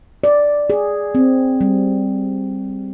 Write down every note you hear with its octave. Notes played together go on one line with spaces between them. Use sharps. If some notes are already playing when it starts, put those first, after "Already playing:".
D5
G#4
C4
G3